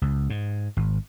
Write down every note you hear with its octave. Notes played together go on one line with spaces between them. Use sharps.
C#2
G#2
G#1